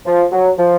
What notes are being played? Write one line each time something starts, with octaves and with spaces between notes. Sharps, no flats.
F3
F#3
F3